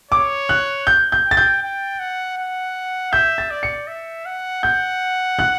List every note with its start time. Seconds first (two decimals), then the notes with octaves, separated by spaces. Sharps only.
0.12 C#5 D6
0.49 F#6
0.87 G6
1.12 G6
1.25 G5
1.31 A6
1.37 G6
1.63 G5
2.00 F#5
2.37 F#5
3.12 E5 G6
3.38 A6
3.51 D5
3.63 C#7
3.88 E5
4.26 F#5
4.63 F#5 G6
5.39 F#6